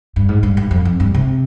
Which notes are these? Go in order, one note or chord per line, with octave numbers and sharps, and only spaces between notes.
G2
G#2
G2
G2
F2
F2
G2
C3